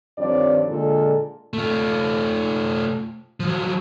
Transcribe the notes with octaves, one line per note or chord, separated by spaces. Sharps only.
G2 D#3 F3 C4 C#5 D5
A#2 D3 G#3 D4 F4 A4
A3 F4
F3 F#3